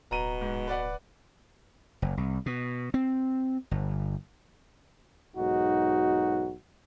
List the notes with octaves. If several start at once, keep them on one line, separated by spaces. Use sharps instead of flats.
D1 B2 A#5 D#7
G#2
B4 D5 F#5
F#1
C2
B2
C4
G1
B1 G#2 D#4 F#4